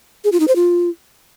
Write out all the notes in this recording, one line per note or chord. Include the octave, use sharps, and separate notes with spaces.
G#4
F4
D#4
C5
F4